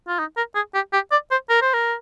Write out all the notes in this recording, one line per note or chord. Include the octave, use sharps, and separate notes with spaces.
F4
D#4
A#4
G#4
G4
G4
D5
C5
A#4
C5
A#4